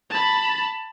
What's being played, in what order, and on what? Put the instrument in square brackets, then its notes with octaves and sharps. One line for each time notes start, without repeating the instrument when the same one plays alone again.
[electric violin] A5 B5